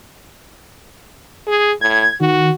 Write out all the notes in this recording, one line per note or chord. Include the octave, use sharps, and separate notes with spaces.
G#4
A2 G#6
D#3 F#4